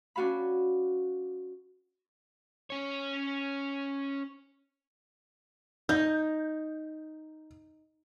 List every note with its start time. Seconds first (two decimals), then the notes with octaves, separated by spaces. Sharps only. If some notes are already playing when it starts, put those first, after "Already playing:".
0.16 C#4 D4 F#4 F5 B5
2.70 C#4 C#5
5.89 D#4 G6